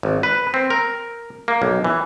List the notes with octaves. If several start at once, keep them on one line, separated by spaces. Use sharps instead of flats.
G#1
B4
C4
A#4
A#3
B1
E3